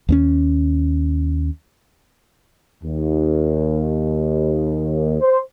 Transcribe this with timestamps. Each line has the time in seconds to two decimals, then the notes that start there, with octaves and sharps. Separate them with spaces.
0.09 D#2 B3 C#4
2.83 D#2
5.21 C5